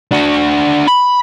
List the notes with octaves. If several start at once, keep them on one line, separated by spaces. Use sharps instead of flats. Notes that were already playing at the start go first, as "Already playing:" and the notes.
D4 F#4
B5